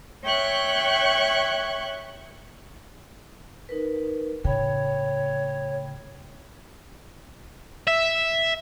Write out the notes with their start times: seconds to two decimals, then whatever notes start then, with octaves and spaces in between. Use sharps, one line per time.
0.24 C#5 E5 G5 C#6 F#6 G#6
3.69 D#4 A#4 B4
4.44 A2 C#3 C#5 G5 B5
7.87 E5